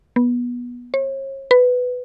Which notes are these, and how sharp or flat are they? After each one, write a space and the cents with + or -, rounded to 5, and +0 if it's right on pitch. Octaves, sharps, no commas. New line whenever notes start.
B3 -20
C#5 -40
B4 +10